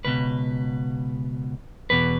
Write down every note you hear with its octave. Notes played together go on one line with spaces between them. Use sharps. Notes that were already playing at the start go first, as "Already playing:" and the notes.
C#2 B2 B4
E2 B2 B4